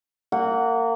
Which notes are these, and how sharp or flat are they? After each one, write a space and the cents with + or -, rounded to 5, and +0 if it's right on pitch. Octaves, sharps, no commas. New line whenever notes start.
A#3 -25 F#5 +0